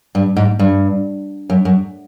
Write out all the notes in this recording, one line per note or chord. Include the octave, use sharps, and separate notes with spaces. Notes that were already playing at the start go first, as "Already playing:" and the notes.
G2
G#2
G2
F#2
F#2